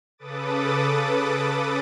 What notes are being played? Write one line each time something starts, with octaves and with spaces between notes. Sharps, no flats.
C#3 A4 B4 D6 D#6 A6